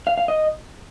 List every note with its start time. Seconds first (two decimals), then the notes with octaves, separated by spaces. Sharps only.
0.07 F5
0.18 F5
0.28 D#5